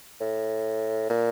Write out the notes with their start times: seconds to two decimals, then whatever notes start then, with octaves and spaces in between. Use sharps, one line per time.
0.21 A2
1.10 A#2